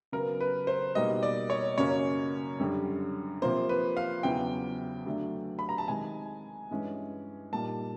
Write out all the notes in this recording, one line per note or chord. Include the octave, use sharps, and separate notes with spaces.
C#3 F#3 B3 A#4
B4
C5
B2 G3 A#3 D#4 D#5
D5
C#5
F#2 C#3 F#3 A#3 C#4 C#5
F#2 D3 G3
C3 F3 A#3 C5
B4
F5
E2 C#3 F#3 B3 E4 G5
D3 F#3 A3 D4
B5
A#5
A5
C3 D#3 G#3 G#5
G2 E3 G#3 C#4
A#2 G3 A#3 D#4 A5